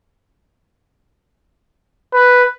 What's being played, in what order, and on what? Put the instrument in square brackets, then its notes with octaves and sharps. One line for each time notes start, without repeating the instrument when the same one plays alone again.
[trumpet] B4